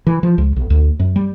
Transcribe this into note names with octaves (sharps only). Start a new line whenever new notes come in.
E3
F3
C#2
B1
D2
F#2
G3